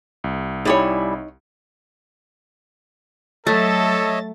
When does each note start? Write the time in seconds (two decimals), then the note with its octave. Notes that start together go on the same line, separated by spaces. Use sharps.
0.24 C2
0.65 G3 D#4 E4 C#5 G#5
3.47 F#3 A3 A4 C#5 D#5 E5 A6